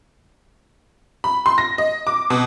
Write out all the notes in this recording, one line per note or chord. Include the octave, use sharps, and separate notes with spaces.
B5
C6
A#6
D#5
D6
B2